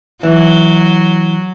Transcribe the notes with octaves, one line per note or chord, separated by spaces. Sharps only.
E3 F#3